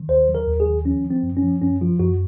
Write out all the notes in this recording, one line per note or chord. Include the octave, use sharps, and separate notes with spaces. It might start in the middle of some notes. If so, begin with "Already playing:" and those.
Already playing: D#3
D#2 C5
F#3
A#4
D#2
G#4
D#3
F3 C#4
F3
C4
F#2
C#4
F3
F#2 C#4
F3 F4
F#2 F#4